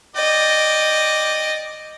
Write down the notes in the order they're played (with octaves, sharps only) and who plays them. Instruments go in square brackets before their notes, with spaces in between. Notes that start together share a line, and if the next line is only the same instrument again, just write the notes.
[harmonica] D5 G5 [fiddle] D#5